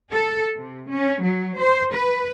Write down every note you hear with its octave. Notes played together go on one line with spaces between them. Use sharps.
A4
C3
C#4
F#3
C5
B4